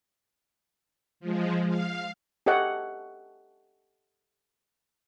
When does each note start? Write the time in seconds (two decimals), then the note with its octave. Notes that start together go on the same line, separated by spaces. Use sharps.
1.20 F3 G#3
1.68 F5
2.46 G4 A4 C#5 D#5 F#5